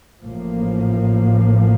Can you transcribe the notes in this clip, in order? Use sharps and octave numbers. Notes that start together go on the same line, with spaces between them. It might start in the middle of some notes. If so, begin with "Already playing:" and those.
A1 A2 F3 A#3